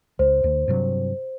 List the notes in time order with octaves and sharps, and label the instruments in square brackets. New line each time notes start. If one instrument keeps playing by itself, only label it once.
[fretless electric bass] C#2 [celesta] C5
[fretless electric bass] D2
G2 C3 F#3